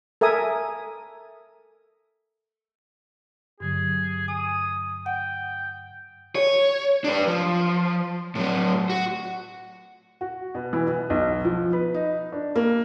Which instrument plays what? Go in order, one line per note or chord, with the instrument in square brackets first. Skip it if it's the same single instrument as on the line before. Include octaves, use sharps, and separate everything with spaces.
[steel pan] A4 A#4 E5 G#5 D#6
[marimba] G2 D3 F#3 [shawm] G#4
[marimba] G#5 [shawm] D#6
[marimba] F#5 [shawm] G5
[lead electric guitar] C#5
D4 B4
F3
A2 F#3
F#4
[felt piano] F#4
B2
E3
B2
B1
F3
B4
D#4
D4
A#3